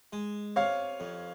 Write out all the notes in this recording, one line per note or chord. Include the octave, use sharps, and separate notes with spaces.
G#3
C3 C#5 F5
F2